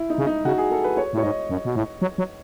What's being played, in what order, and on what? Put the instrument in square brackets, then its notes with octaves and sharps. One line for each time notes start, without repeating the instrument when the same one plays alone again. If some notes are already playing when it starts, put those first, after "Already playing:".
Already playing: [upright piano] E4
D#4
[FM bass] C#3
[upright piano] D#4
[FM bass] C#3 [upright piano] F#4
[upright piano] G#4
A4
B4
C#5
[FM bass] A2 [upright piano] C#5
[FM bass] G#2 [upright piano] D#5
[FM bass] F#2
B2
A2
F#3
F#3